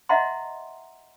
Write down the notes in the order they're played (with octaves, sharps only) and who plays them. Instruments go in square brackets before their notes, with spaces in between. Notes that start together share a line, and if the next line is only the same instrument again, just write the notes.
[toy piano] D#5 E5 F#5 A#5 C6